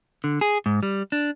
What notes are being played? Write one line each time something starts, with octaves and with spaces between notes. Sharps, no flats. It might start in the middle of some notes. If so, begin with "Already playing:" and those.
D3
G#4
G#2
G3
D4